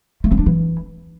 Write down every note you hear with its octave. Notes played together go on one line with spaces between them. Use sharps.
A3
C4
D4
E3